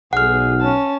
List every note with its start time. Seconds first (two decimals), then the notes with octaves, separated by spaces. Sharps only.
0.13 B1 G#4 F#5 F6
0.61 C#4 A5